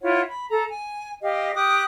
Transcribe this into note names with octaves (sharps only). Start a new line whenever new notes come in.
E4 F4 C#5 F#5
B5
A4 A#5
G#5
G4 D#5 F5
G4 D6 D#6 F#6